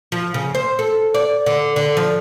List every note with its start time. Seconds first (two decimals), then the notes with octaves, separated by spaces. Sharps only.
0.12 F3
0.34 C#3
0.55 C5
0.79 A4
1.14 D5
1.46 D3
1.76 D3
1.97 F3